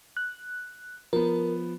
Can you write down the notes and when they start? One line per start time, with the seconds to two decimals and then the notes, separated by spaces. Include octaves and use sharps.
0.17 F#6
1.13 F3 B3 A#4